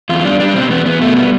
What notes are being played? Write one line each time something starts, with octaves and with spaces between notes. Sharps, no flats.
E2 F4
G3 D4
G3 D4
B2 C4
E2 B3
E2 B3
B2 A3
G3 B3